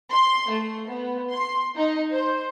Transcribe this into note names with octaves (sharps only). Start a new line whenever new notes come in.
C6
A3
B3
C6
D#4
C5